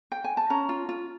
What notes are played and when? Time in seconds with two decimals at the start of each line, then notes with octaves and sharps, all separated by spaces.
0.12 G5
0.24 G#5
0.37 A5
0.50 C#4 A#5
0.69 F4
0.89 F4